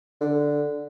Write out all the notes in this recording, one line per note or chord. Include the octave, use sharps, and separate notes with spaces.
D3